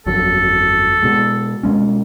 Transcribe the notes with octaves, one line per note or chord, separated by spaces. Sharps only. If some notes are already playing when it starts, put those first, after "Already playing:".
G1 F2 F#3 A4
B2 G#3
B2 G#3 C#4